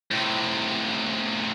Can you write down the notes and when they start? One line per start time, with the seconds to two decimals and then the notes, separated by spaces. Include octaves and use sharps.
0.12 A2 C3